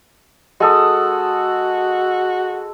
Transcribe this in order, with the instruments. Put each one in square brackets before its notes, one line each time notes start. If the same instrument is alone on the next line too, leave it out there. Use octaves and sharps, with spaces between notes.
[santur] G#3 A4 D#6 [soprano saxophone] F#4